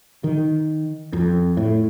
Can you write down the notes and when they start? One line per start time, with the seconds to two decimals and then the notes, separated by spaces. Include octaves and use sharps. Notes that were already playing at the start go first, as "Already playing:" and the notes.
0.24 D#3
1.13 F2
1.57 A2